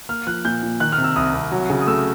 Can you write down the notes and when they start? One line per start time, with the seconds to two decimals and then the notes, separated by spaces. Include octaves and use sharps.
0.09 A#3 F6
0.27 F3 F#6
0.45 A#2 G6
0.63 A#2
0.80 D#3 F#6
0.92 F6
0.98 C3
1.04 E6
1.16 C2 D#6
1.34 C2
1.52 F#3
1.70 C#3
1.82 D#6
1.87 A3 E6